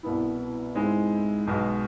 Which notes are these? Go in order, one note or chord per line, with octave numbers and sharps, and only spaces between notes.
C2 B2 B3 E4
G#2 G#3 C4 E4 G#4
B1 B2 G#3